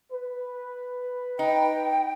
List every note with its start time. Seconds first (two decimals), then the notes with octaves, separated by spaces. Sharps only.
0.11 B4
1.39 D#4 G5